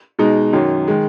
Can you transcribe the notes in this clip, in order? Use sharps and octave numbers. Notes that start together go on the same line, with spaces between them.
B2 G#3 D#4
F#2 D#3 F#3
D#3 G#3